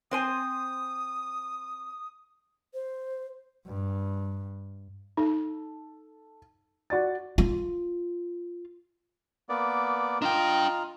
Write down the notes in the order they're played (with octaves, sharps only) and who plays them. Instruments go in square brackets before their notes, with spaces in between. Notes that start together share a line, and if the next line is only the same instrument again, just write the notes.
[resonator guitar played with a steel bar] C4 C5 G#5 [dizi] D#6
[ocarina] C5
[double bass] G2
[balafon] D#4 [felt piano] A4
[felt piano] F#4 D5 A6
[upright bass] F4
[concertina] A#3 B3 D5
[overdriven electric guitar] D4 G5 [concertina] F4 D#5 A#5